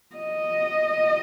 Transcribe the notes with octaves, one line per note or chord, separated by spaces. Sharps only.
D#5